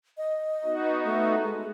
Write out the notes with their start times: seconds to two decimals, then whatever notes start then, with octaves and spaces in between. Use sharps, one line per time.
0.17 D#5
0.65 B3 D#4 F#4
1.04 A3
1.43 G#3